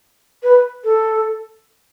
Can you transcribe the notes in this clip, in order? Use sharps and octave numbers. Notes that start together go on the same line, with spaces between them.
B4
A4